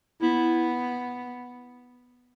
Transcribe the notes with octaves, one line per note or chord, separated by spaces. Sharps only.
B3 E4